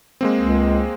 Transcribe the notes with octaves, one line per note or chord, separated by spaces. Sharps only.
G#3 A#3 C4
C#2